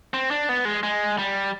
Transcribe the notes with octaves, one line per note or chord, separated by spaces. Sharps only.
C4
D4
B3
G#3
G#3
G3